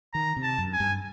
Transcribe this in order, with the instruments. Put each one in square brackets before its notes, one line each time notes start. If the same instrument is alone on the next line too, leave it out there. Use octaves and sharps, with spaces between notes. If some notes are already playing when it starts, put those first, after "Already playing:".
[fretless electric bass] D#3 [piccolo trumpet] A#5
[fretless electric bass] C3
[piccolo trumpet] A5
[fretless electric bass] F#2
[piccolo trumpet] G#5
[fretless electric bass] G2